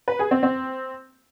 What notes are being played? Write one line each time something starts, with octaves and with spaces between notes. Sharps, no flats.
B4
G#4
C4
C4